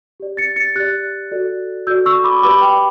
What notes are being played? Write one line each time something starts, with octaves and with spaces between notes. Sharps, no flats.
G4 D5
A6 C#7
A6 C#7
G4 D5 F#6 A6
F#4 A4 D5
F#4 A4 D5 E6 G6
C#6 E6
B5 D6
G4 B4 D5 B5 D6
G5